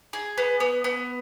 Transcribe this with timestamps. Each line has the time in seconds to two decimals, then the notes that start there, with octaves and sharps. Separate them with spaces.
0.13 G#4
0.38 B3
0.60 B3
0.84 B3